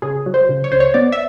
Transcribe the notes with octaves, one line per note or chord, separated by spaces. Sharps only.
C#3 G#4
F#3
C5
C#3
C#5
C#2 C5
C#5
B3 D5
E5